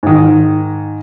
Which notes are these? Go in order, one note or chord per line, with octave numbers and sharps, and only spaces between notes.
G#2 D#3